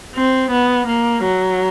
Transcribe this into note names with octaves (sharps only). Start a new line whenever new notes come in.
C4
B3
A#3
F#3